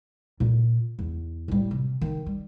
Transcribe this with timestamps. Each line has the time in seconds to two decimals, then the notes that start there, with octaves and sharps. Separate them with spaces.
0.40 A#2 F4
0.99 E2
1.48 A2 G3
1.71 C3
2.01 D#3
2.26 G3